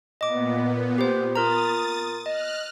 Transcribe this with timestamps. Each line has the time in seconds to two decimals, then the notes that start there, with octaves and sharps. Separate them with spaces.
0.21 A#2 B3 D#5 D6
0.98 G4 C5
1.36 F4 A#4 A#5 D#6 A6
2.26 D#5 F6 F#6